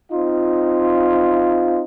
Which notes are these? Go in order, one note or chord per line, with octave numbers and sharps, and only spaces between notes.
C4 D#4 F4